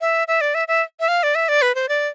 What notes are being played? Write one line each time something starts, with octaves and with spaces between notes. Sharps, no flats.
E5
E5
D5
E5
E5
E5
F5
D5
E5
D5
B4
C5
D5